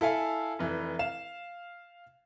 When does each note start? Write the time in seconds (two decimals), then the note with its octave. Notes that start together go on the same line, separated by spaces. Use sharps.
0.01 E4 A4 F5 G#5
0.59 F1 E3
0.99 F5 E7